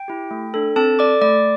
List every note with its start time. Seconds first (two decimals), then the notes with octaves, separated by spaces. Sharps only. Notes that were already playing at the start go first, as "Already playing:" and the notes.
Already playing: G5
0.08 E4 G4
0.31 A3
0.54 D4 A4
0.76 C4 A4 A5
0.99 A4 D5 D6
1.22 A3 D5 D6